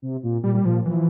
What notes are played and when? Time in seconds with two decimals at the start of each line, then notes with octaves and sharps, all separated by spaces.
0.02 C3
0.23 A#2
0.44 A#2 G3
0.55 G3
0.65 A#2 F3
0.86 E3 F3